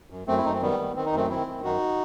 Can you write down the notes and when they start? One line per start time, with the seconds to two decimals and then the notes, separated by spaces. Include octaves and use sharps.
0.10 F#2
0.27 F#2 A3 C4
0.37 E4
0.45 F#2 D#4
0.54 C4
0.62 D#3 G3 B3
0.79 D#3
0.95 D#3 C4
1.06 D#4
1.13 F#2 A3 C4
1.30 D#3 C4 E4
1.47 D#3
1.64 F#2 D#4 F#4